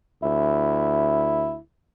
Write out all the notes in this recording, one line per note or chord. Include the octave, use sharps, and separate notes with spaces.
D2 E4